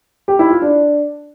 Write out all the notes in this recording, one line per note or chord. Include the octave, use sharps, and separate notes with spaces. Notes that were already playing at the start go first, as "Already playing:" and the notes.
G4
E4
F4
D4